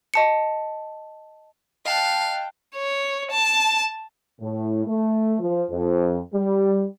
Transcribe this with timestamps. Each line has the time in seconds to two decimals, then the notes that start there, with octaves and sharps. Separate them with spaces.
0.14 D#5 A5 C#7
1.86 D#5 F5 G5 A5 F#6
2.76 C#5
3.31 A5
4.40 A2
4.85 A3
5.38 F3
5.70 F2
6.33 G3